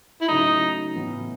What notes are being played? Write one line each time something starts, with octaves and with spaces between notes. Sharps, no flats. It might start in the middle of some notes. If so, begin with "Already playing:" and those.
E4
C#3 F#3 A3 D#4
A2 E3 B3 E4